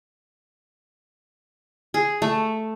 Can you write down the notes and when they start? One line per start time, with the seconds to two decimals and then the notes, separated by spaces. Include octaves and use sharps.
1.94 G#4
2.22 A3